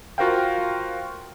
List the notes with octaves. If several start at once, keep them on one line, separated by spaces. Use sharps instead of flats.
F4 F#4 A#4 C5 F5 G5